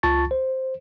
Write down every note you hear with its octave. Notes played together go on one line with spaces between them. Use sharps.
C#2 F4 A5 C#6 A6
C5